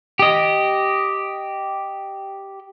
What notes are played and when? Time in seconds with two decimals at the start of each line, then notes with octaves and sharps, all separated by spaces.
0.19 G4 D#5